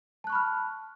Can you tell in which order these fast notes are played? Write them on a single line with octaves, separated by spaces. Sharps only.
A5 F#6 C#6 B5 F6